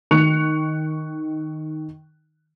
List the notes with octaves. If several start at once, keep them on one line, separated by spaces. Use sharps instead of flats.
D#3 C#6 F#6 C#7 F7